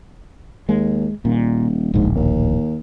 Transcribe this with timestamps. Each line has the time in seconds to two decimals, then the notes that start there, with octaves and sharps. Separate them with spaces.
0.69 D#2 G#3
1.25 D#1 A#2
1.94 D1 A#1 G#2
2.16 D#2